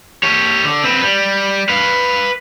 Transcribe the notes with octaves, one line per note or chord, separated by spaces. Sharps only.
G4 C#5
D3
C4 B4
G3
B4 F5